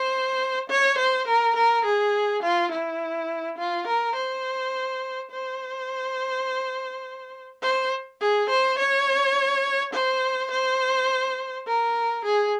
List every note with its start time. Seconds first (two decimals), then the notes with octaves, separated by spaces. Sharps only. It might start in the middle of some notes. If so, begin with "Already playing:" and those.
Already playing: C5
0.70 C#5
0.98 C5
1.27 A#4
1.56 A#4
1.85 G#4
2.43 F4
2.72 E4
3.58 F4
3.87 A#4
4.16 C5
5.31 C5
7.62 C5
8.21 G#4
8.49 C5
8.79 C#5
9.93 C5
10.51 C5
11.67 A#4
12.25 G#4